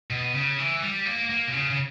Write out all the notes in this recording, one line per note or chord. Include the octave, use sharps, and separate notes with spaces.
B2
C#3
E3
G3
A#3
A#3
B2
C#3
C#3